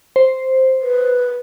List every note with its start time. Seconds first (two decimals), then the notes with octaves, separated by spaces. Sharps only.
0.16 C5
0.82 B4